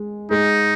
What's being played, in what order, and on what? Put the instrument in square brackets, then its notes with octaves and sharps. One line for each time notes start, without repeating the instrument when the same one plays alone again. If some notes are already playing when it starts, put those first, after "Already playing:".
Already playing: [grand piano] G#3
[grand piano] G#3 [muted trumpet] D#4